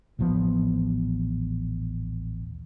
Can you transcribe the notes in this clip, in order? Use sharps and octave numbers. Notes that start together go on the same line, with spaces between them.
D#1 A1 F3 B3